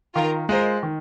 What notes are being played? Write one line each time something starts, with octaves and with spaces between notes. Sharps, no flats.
D#3 F4 A#4
G#3 F4 A#4 C5 D#5
D#3